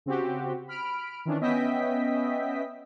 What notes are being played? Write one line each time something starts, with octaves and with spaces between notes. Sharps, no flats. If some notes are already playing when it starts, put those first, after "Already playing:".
C#3 C4 F#4 G4
B5 F6 D7
D#3 E3 C#4 D4
B3 C#4 D#5 E5 G5 B6